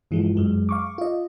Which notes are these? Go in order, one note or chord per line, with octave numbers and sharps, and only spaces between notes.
G2 E3 F3 G#3
F#2 G#3
F5 C#6 D6
F4 D#5